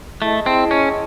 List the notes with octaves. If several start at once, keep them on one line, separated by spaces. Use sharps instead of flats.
A3 E4 G#4 D#5 A5
C4
C#4